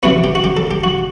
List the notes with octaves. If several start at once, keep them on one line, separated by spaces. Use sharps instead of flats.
C3 E3 B3 F#4
G4
F#4
G4
A4
G4
F#4